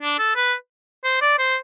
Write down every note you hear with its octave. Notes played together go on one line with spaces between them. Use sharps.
D4
A4
B4
C5
D5
C5